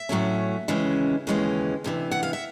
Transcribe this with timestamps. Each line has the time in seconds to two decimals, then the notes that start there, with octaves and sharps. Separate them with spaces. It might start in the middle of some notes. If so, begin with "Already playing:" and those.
Already playing: E5
0.09 A2 F#3 A3 C#4
0.68 D#2 C#3 E3 G#3 C#4
1.27 D#2 C#3 E3 G#3 C#4
1.84 D2 C3 E3
2.11 F#5
2.23 F5
2.33 E5